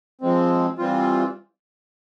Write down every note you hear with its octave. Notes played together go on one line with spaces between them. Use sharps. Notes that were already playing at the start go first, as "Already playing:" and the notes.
F3 G#3 C4
E3 G3 C4 F4